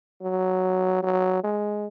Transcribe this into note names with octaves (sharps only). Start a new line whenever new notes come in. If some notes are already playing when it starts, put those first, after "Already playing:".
F#3
F#3
G#3